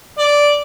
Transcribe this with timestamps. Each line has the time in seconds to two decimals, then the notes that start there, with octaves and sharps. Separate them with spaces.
0.19 D5